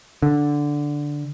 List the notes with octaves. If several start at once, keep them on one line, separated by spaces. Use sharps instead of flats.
D3